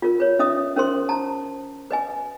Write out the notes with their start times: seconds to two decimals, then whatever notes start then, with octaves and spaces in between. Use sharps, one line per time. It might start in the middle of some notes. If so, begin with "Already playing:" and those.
0.02 F4 A#4
0.20 B4 C#5
0.39 C#4 D#5 E5 D#6
0.76 C#4 A#4 C5 C6
1.09 A5 A#5
1.91 B4 D#5 G#5